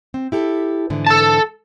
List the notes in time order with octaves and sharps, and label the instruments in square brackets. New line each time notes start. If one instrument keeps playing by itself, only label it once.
[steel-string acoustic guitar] C4
E4 G4 A4
G#2 D3 E3
[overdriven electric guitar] A4 A5